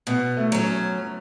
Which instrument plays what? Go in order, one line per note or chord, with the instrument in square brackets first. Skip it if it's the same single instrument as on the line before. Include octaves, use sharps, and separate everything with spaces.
[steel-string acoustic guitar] B2 [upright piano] B3
[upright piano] A3
[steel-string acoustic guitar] F#3 C#4